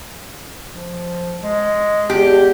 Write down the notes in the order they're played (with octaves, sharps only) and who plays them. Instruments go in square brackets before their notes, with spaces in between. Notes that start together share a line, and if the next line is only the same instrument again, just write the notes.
[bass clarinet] F3
G#3
[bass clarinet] E2 [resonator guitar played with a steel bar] G4